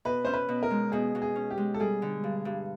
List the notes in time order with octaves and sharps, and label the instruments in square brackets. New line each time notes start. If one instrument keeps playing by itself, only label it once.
[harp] B2 [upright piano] B4
[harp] C#4 [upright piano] C5
[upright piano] B4
[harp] B2
[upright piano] A#4
[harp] G#3
[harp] B2 [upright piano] G#4
[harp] B2
[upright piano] G#4
[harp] C#4
[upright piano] G4
[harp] G#3
[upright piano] A4
[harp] G3 [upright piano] G#4
[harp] D3
G2
G2